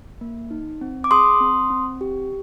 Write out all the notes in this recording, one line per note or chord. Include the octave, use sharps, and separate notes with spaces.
A#3
D#4
C4
D6
G#4 C6 D#6
C4
C4
G4